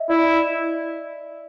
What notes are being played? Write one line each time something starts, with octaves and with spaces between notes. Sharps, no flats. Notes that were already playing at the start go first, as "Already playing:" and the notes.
Already playing: D#5 E5
E4 D5